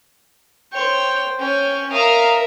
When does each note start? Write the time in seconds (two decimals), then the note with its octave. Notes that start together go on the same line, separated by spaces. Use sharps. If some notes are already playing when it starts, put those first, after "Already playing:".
0.73 C5 C#5 G5
1.39 C#4 C#5 G5
1.92 A#4 E5 F5 A#5 D#6